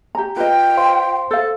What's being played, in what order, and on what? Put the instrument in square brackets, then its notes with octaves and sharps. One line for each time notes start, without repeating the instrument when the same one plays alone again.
[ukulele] G4 A#5
[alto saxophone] F4 [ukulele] B4 D#5 [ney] G5
[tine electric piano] C5 F5 C6
[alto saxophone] A4 [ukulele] C5 F5